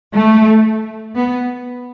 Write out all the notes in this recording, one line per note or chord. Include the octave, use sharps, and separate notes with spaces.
A3
B3